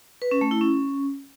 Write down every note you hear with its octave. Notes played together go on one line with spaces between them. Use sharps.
B4
C#4
A3
E4
C#4